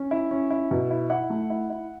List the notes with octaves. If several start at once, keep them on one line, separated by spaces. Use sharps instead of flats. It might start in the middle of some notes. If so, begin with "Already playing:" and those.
Already playing: C#4
E4
C#4
E4
B2
E4
E4 F#5
A3
E4
E4